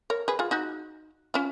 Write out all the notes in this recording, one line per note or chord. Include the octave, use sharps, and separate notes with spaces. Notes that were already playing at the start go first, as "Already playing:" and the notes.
A#4 C#5
G#4 B4
F4 G#4
D#4 F#4
C#4 F4